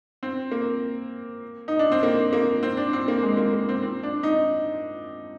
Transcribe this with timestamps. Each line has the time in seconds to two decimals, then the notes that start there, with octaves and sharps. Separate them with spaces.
0.23 C4
0.52 A#3
1.68 D#4
1.79 D4
1.92 C4
2.03 A#3
2.33 A#3
2.63 C4
2.77 D4
2.93 C4
3.08 A#3
3.23 G#3
3.37 A#3
3.53 A#3
3.69 C4
3.82 C4
4.03 D4
4.23 D#4